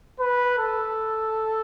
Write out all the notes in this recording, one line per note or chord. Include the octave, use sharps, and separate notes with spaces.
B4
A4